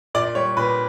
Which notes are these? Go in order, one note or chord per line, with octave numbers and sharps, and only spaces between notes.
A#2 D5
G3 C#5
A#2 B4